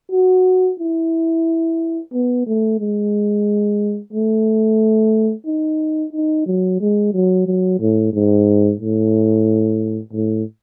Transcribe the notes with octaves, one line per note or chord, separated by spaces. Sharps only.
F#4
E4
B3
A3
G#3
A3
D#4
D#4
F#3
G#3
F#3
F#3
A2
G#2
A2
A2